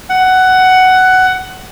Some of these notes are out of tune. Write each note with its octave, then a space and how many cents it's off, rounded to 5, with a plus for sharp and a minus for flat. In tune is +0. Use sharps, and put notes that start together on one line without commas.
F#5 +10